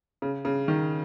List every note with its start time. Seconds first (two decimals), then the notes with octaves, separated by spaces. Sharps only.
0.22 C#3
0.45 C#3
0.68 D#3